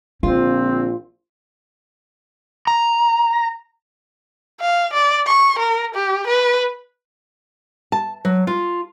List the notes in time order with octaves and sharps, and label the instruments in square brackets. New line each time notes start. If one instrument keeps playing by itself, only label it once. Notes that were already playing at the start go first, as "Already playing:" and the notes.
[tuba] A#1 [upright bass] D3 [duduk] C4 [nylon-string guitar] F4
[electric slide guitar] A#5
[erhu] F5
D5
C#6
A#4
G4
B4
[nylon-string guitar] A5
F#3
F4